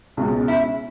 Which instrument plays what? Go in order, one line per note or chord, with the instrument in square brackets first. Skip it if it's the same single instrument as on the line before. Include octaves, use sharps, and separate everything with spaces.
[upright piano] C#2 B2 G#3
[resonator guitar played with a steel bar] E4